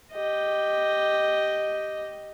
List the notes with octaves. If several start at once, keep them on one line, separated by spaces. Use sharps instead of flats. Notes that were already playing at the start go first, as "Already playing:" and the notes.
G4 D#5